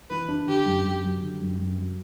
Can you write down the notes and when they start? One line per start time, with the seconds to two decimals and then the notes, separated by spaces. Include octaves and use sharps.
0.10 E3 B4
0.29 D4
0.47 D3 G4
0.66 F#2
0.84 F#2
1.03 F#3
1.22 D3
1.41 F#2
1.58 F#2
1.78 F#3